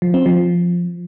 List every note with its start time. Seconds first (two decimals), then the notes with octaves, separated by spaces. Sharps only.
0.02 F3
0.14 C4
0.26 F3